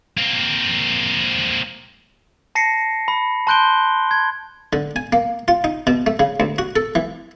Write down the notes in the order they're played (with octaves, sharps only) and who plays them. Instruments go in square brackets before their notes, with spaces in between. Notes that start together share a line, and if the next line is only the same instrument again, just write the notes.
[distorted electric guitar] A#3 C4
[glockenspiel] A5 A#6 C7 C#7
B5
A5 C6 F#6 G6 D7 G7
G#6
[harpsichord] D3
G#5
A#3
F4
D#4
B2
A3
C#3
D2
F#4
A4
E3